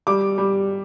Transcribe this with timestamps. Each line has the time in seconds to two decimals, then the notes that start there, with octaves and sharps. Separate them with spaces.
0.07 G3 D6
0.38 G3